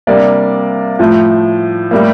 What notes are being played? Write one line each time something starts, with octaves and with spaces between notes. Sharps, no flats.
C3 G3 A#3 D4 D5
A2 F3 A3
A2 G3 A#3